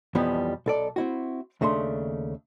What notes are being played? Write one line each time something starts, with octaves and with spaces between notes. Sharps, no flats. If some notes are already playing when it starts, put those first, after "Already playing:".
B1 F2 E3 F3 G3 B3
B1 A4 D5
C4 E4 F#4
D#2 C#3 A3 D4 C6